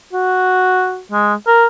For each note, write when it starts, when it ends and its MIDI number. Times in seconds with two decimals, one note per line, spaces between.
0.13 1.00 66
1.12 1.34 56
1.47 1.67 70